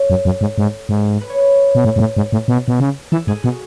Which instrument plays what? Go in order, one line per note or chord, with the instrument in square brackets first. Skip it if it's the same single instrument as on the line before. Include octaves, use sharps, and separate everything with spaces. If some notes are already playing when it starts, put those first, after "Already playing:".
Already playing: [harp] A4 C#5
[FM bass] F#2
F#2
G#2
G#2
G#2
[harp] B4
C#5
B4
[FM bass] B2
A2
G#2
A2
G#2
A2
B2
B2
C#3
[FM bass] E3 [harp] A4
[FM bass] G#2 [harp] G#4
[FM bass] B2 [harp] F#4